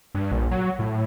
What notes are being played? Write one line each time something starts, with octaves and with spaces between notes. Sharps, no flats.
G2
A#1
F#3
A2